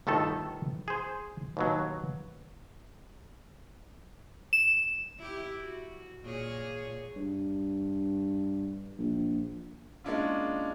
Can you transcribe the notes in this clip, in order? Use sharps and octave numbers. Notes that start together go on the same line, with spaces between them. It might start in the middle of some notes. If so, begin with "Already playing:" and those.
G1 B2 D#3 A3 A4
G#4 C5
D#2 B2 F#3
E7
E4 G4
F#4
A#2 G#4 C#5
G2
A#1
G#3 A#3 C#4 D4 E4 F4